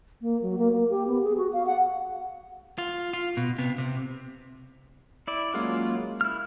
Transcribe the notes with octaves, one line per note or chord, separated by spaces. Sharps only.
A#3
F#3
A#3
A#3
G4
B3
G#4
F#4
F5
F#5
F4
F4
B2
C3 B3
C3
E4 D5
F#3 G#3 A#3 C#4 F4
E4 F6